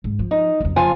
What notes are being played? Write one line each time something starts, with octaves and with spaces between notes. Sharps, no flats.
G#2
F3
D#4
F#1 F2
F3 F4 G#5